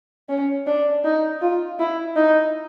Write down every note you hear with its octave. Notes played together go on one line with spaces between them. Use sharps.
C#4
D4
D#4
F4
E4
D#4